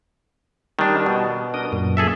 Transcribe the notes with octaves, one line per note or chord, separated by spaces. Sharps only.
D#3 G3 D4
B2
D4 A#4 D#6
F#2 A#2
G#4 A4 E5